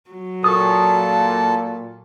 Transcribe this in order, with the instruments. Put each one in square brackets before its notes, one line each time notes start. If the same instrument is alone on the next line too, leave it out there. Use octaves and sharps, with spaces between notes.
[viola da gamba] F#3
[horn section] A#2 [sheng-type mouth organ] A4 A5 [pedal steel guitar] C#6 D#6